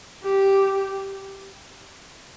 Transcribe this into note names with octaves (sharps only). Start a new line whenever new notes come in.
G4